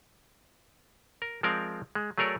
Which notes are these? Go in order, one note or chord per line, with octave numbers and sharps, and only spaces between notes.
A#4
F3 G#3 C4 A#4 D5 F5
G#3
F#3 A3 G#4 A#4 C#5 D5